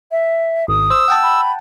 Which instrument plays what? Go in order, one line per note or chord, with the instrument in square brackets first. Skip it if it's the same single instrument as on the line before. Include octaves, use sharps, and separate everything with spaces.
[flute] E5
[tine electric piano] G#1 [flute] D#6
[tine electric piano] C5 [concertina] E6
[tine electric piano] F#5 G5 A5
[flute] B5